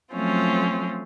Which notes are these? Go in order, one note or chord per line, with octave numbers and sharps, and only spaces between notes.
F3 F#3 A3 C4 C#4 F4